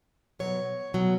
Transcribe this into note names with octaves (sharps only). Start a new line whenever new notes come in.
B2 F#3 C#5
B2 F#3